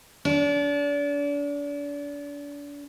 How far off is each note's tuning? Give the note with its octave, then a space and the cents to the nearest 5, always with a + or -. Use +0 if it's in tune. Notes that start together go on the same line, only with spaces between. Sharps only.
D4 -35